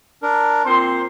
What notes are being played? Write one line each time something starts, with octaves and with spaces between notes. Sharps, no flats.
D4 A#4
A#2 C4 C5 C6